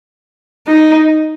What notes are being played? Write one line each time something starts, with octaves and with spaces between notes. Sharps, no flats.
D#4